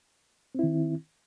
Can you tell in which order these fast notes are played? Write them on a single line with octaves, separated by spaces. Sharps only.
C4 E4 D#3